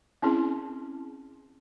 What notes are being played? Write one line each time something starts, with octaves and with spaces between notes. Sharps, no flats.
C4 C#4 E4 G#4